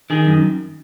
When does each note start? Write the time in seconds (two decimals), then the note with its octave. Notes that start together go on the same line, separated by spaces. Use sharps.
0.10 D#3 G#4
0.26 F#2